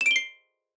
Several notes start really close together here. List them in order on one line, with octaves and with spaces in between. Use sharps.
E7 D7 G7 C7